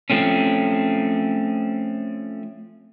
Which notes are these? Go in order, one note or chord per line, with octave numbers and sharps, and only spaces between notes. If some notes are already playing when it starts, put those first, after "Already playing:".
F3 A3 C4 C#4